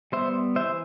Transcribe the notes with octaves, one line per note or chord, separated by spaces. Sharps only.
G3 B3 C5 E5
E3 C5 E5